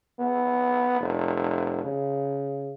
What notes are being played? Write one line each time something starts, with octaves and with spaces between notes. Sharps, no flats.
B3
F1
C#3